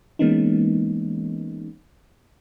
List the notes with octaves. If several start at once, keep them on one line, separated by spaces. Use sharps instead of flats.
E3 G#3 A#3 B3 C#4 D#4